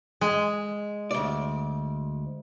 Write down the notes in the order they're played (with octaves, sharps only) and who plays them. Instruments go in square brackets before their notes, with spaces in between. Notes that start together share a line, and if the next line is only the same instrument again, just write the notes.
[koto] G#3
[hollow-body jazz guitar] D2 D5